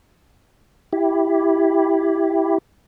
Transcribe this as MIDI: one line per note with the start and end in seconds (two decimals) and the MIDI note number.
0.93 2.58 64
0.93 2.58 67